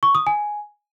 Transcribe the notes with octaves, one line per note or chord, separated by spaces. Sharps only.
C#6
D#6
G#5